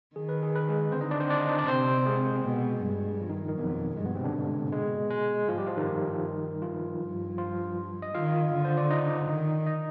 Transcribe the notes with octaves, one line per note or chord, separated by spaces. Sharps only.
D#3 G#4
B4
G#4
B4
G#3 G#4
D3 C4 C5
D#4 D#5
D4 D5
C4 C5
D4 D5
D#4 D#5
D4 D5
C3 C4 C5
G#3 G#4
B2
G2
F3 F4
D#3 D#4
D#3 D#4
F2 B2 B3
G2 G#3
B2 B3
C3 C4
D3 D4
G#2
B2 G#3
G#3
G#2 F3 F4
G3 G4
F3 F4
D#3 D#4
G2
F3 F4
G2
F3 F4
D#5
D#3 F4 F5
D3
C5
D5
D#4 D#5
D#3
D#4 D#5